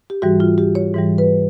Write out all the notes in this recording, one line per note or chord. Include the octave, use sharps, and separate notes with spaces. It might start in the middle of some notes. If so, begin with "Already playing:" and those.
G4
G#2 E3 G3 F#4
F4
G4
C#5
G#2 E3 G3
B4